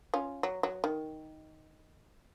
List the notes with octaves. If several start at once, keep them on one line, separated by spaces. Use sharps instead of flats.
C#4 F4
F#3
F#3
D#3